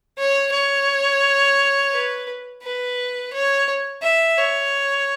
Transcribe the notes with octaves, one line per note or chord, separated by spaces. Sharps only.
C#5
C#5
B4
B4
C#5
E5
C#5